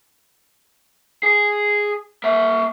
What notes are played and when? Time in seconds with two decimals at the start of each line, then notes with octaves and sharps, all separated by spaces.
1.23 G#4
2.24 A#3 E5